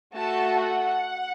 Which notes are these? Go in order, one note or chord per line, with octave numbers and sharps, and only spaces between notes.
A3 F#4 A4 A5
F#5